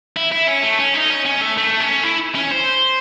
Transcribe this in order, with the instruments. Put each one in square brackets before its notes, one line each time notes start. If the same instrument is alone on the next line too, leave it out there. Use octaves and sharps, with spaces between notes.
[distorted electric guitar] E4
E4
C#4
A3
C#4
D#4
C#4
C#4
A3
A3
C#4
E4
C#4
C5